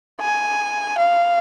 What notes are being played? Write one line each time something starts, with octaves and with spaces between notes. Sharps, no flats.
G#5
F5